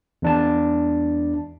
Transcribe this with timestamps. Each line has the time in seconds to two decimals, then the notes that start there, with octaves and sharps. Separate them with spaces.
0.22 E2 D4 A5